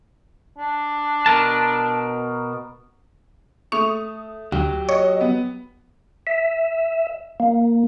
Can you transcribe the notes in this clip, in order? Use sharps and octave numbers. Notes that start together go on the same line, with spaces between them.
D4
B2 A#4 A5
A3 C#6 D#6 F7
D2 F#3 G4
C#5 D#5
B3
E5
A#3